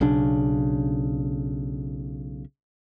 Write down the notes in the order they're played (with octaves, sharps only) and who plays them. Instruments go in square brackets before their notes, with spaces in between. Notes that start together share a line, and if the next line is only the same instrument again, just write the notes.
[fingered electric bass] B1 C#3 C#4 D4